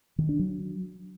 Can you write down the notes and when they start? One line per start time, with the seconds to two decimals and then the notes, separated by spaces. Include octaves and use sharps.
0.18 D#3
0.29 D4
0.39 F#3